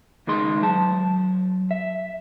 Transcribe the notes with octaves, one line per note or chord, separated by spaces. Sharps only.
C#2 D#3 G#3 C6
F#3 A5
E5